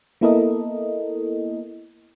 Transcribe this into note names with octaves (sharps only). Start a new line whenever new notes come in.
A#3 B3 E4 A4 A#4 D#5